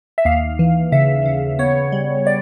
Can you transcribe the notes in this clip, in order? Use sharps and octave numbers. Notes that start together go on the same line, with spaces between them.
E5
D#2 F5
E3
C#3 E5
C#3
B3 C#5
G3
D5